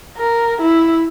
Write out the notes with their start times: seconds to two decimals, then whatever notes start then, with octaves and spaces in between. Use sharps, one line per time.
0.18 A#4
0.62 E4